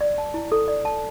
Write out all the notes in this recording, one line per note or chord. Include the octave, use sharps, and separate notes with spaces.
D5
A5
E4
A4
D5
A5